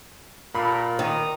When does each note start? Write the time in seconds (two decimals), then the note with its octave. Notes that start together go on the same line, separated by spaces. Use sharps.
0.55 A#2 G4 A4 A#4 B5
0.99 D#3 A#5 D#6